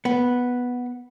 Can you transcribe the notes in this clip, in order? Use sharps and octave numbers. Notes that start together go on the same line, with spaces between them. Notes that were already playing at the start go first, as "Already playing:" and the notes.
B3